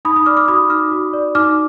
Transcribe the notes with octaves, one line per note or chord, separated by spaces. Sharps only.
D#4 B5 D#6
B5 D#6
D5 D6 F6
D6 F6
F#4 B5 D#6
D#4 D6 F6
F#4
D5
D#4 D6 F6